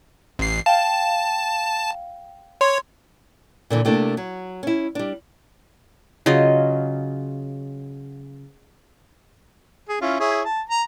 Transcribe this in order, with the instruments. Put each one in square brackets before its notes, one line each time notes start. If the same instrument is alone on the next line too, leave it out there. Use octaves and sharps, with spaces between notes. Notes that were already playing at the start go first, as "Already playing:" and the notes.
[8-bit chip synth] A1 C7
[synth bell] F5 G5 [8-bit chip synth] A5
[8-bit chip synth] C#5 [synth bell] C6
[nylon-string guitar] A#2 D3 E3
C3 A3 A#3 D4
F#3
C#4 E4
G3 D4
[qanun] C#3 F#3 F4 D#5
[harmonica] G#4
C#4 E4 F4
E4 G#4 C#5
A5
A#5